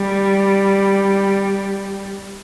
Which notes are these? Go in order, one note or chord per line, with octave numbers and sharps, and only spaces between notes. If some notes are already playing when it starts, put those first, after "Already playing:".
Already playing: G3